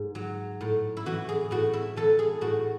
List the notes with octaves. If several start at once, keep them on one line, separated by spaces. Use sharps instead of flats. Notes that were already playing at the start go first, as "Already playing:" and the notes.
Already playing: G#2 G#4
F#3
A2
E4
E3 F#4
G#4
A2 F#4
E4
E3 A4
G#4
A2 F#4